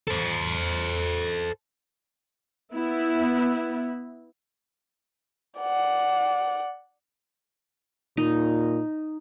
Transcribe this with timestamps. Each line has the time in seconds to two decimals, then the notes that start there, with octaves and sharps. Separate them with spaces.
0.08 A4 C5
2.72 B3 E4
5.59 D5 F#5
8.17 A#2 D#4